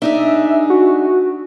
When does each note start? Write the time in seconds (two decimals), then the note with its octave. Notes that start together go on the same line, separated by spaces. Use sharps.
0.02 D4 D#4 G#4 E5
0.70 F#4